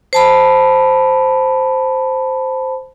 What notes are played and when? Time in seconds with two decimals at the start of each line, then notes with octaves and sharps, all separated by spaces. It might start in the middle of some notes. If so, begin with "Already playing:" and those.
0.13 C5 A5 B5